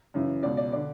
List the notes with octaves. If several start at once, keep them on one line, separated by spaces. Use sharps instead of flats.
F#2 C#3 E3
C#2 B2 D5
D5
D3 D5